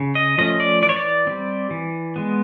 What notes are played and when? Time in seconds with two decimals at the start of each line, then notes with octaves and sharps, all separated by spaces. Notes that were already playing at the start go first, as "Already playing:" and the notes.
Already playing: C#3
0.15 D#5
0.38 F3 A3 C#4 D#5
0.60 D5
0.82 E3 D5
0.89 C#5
0.96 D5
1.27 G3 C4
1.71 E3
2.16 G#3 B3